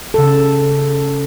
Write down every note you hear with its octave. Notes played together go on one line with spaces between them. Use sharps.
C#3 A4